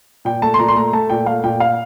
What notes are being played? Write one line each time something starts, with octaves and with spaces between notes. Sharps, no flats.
A#2 G5
A3 A5
C6
A#2 A#5
C6
A3 A#5
A3 A5
A#2 G5
A3 F5
A#2 G5
F5